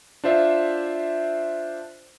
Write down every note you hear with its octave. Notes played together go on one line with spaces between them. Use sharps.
D4 F4 C5 E5